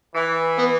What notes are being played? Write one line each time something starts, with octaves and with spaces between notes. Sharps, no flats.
E3
B3